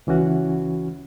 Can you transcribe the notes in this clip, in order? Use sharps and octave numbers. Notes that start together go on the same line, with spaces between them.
C#2 E3 C#4 F#4